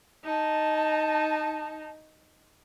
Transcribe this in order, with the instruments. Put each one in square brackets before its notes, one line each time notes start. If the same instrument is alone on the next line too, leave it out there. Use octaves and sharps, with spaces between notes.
[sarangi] D#4 [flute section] A5